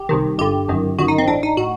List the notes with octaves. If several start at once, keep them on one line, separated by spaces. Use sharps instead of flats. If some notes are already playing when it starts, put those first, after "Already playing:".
Already playing: G4
C2 C3 D#3
G1 G2 D3 G4
G1 F#2 D#3
G1 F#2 D#3 F#4
D#4
C4
A1 A2 D4
D#4
A2 F#4